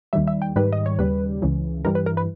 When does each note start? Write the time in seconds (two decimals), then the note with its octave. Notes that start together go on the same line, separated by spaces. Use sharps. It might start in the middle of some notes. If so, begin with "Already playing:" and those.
0.13 D#2 D#3 G3 E5
0.27 E5
0.42 G5
0.56 G#2 D#3 G3 B4
0.73 D#5
0.86 C#5
0.99 D#2 C#3 G3 B4
1.42 C#2 C#3 E3
1.85 G2 E3 G3 A#4
1.95 B4
2.06 A#4
2.17 B4